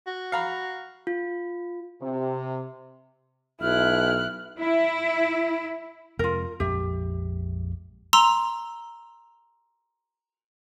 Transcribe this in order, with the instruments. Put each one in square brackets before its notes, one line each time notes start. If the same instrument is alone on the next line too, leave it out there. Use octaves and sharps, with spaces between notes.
[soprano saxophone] F#4
[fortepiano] F5 A#5 B5
[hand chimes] F4
[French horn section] C3
[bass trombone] B1 [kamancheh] E4 F#6 [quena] F6
[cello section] E4
[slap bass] F2 C3 G#3 [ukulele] F4 A#4
[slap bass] A#1 F2 G#3 [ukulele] G4 E5
[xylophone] A#5 C6 E6 F7